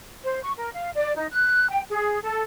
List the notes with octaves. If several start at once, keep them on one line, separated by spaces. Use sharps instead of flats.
C5
C#6
A#4
F5
D5
D#4
F#6
G5
G#4
A4